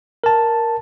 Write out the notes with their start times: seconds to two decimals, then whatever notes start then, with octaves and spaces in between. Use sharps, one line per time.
0.24 A#4 A5